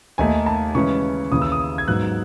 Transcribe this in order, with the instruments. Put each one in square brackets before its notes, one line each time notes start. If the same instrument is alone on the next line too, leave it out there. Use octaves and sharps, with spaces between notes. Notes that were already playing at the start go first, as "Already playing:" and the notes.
[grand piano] D#2 D#3 A3 D#4 G#5
A5
C#3 E3 G#3 C#4 E4 C#6
D#2 C#3 E3 D#6
E6
D#6
G#6
G#2 F#3 B3 F#6